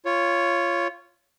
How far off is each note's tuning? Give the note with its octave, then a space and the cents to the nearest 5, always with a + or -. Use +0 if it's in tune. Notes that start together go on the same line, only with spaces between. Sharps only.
F4 -15 C#5 +0